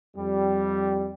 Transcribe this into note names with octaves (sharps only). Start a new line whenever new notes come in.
F2 G3